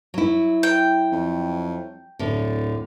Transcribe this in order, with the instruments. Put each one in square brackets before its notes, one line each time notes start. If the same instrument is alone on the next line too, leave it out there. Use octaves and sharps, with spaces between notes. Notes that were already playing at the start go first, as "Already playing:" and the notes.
[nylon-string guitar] F#3 E4
[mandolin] G5
[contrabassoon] F2
[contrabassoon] D1 [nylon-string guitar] A2 D3